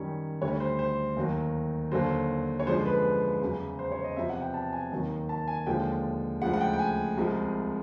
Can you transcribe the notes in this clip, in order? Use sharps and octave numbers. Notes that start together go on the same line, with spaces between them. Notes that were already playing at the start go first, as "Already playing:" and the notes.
Already playing: F#2 D#3 G3 C#5
D2 D3 G3 C#5
C5
C5
D#2 D#3 F#3
D#2 D3 F#3 C5
C#5
F#2 D3 F3 G#3 C5
B4
E2 C#3 F#3
C5
C#5
D#5
E2 C3 F3 E5
F#5
G5
A5
G#5
D#2 D#3 F#3
A5
G#5
D#2 D3 F3 G#3 G5
D2 C#3 F3 G#3 F#5
F#5
G5
G5
G#5
C2 C3 F3 G#3